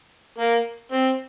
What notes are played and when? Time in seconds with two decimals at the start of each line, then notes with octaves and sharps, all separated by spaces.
0.38 A#3
0.92 C4